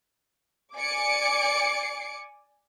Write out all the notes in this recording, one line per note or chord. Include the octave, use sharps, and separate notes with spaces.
D5 G#5 D6 C#7 D7